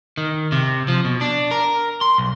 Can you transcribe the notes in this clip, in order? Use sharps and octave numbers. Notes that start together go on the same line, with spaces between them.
D#3
C3
F3
B2
D4
A#4
C6
B1